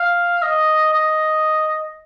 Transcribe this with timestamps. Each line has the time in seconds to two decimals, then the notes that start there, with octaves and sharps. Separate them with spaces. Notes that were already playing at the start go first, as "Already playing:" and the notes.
Already playing: F5
0.42 D#5
0.93 D#5